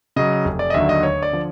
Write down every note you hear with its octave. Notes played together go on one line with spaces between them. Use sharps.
C#3 F#3 D#5
F1
D5
D#5
D#2 D3 F#3 E5
D#5
D2 C#5
D5
D3 F3